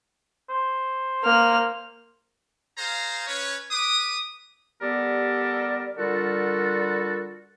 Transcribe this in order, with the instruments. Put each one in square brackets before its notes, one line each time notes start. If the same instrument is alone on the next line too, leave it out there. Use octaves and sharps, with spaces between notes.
[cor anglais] C5
[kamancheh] A#3 F6
[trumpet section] G#4 C5 F5 A#5
C#4 B4 C#5
B4 D6 D#6
[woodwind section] G3 B3 G4 A4 A#4 D5
D3 G3 F4 F#4 A4 A#4